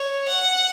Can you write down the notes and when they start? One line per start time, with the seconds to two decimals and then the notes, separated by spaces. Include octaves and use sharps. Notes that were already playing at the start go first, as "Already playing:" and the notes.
Already playing: C#5
0.28 F#5